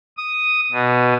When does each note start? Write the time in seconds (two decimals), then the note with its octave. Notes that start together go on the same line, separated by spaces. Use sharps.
0.17 D#6
0.72 B2